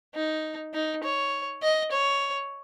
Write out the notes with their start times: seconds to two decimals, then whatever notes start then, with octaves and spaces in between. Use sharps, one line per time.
0.15 D#4
0.74 D#4
1.04 C#5
1.62 D#5
1.91 C#5